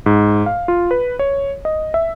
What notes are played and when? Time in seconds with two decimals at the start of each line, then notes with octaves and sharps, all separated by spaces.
0.06 G#2
0.46 F5
0.68 F4
0.91 B4
1.19 C#5
1.65 D#5
1.94 E5